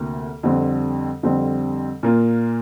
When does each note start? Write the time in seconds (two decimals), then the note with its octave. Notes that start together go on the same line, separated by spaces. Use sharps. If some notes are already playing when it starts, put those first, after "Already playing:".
Already playing: D2 C3 A#3
0.43 F2 D3 G3 C4
1.23 F2 D3 G3 C4
2.03 A#2 A#3 F4